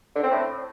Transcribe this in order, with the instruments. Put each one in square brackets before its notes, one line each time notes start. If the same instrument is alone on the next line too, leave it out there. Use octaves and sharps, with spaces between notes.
[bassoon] D3
C4
A2